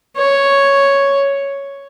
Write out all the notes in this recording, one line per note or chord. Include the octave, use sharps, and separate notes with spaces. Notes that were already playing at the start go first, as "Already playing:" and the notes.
C#5